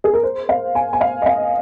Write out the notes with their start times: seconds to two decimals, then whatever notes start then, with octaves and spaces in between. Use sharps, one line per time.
0.04 G#4
0.14 A#4
0.23 C5
0.49 F5
0.75 G#5
0.93 G#5
1.01 F5
1.22 D#5
1.26 F5